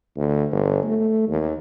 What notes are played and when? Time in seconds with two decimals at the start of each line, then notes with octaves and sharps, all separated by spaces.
0.17 D2
0.51 G1
0.84 A3
1.28 D#2